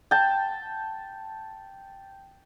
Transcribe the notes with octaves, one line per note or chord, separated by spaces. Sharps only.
G5 A5